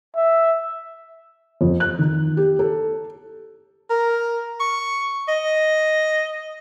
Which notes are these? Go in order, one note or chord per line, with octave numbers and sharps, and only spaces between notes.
E5
F2
F#6
D#3
G4
A4
A#4
C#6
D#5